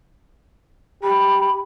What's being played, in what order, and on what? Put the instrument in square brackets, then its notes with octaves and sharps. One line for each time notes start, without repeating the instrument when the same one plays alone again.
[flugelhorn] G4 [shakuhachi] B5